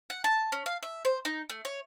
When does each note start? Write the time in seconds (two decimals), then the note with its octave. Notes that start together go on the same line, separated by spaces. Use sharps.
0.10 F#5
0.24 A5
0.52 C#4
0.66 F5
0.83 E5
1.05 C5
1.25 D#4
1.50 A3
1.65 C#5